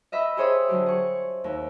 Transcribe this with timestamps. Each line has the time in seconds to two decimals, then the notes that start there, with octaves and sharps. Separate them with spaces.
0.12 D#5 E5 B5
0.37 G4 G#4 C5 C#5 E5 D#6
0.69 D3 F#3 G4
0.86 G#4 C#6
1.44 D#2